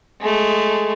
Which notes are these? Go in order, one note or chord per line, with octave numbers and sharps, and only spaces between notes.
G#3 A3